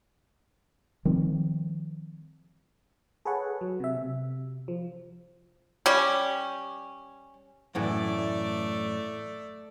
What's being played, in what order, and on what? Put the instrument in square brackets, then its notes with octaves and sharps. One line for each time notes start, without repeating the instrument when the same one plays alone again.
[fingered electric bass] D#3 F3 G3 C4
[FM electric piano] G#4 A4 B4 C#5 F#5
F#3
C3 E5
C3
F3
[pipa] G3 C#4
[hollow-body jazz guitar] F#2 A2 E3 [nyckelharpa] A3 D5